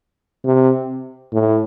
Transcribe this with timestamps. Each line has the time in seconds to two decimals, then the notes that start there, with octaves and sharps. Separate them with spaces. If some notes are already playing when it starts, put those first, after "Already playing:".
0.44 C3
1.32 A2